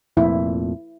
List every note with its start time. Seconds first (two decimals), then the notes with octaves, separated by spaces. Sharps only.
0.17 F1 F2 A#2 E4